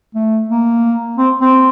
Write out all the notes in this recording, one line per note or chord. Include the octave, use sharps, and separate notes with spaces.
A3
A#3
C4
C4